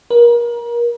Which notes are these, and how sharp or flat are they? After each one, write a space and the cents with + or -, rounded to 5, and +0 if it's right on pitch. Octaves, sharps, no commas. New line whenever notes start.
A#4 +30